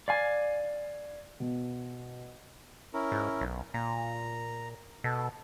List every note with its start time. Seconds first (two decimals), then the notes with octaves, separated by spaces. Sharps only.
0.08 D5 F5 G#5
1.40 B2
2.94 C#4 E4 A#4
3.11 G#2
3.41 B1
3.74 A#2 A#5
5.04 B2 A4